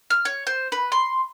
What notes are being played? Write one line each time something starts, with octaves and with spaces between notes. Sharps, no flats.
F6
C#5
C5
B4
C6